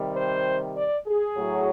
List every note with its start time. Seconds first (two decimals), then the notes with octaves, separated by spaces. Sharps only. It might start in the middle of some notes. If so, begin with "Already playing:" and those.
Already playing: C3 D#3 G3
0.17 C5
0.76 D5
1.07 G#4
1.37 A2 F#3